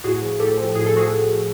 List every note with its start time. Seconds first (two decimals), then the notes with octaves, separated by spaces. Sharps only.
0.04 A2 F#4 G#4
0.22 F3
0.40 A2 G4 A4
0.57 F3
0.75 A2 G#4
0.86 A4
0.93 F3 F#4 G#4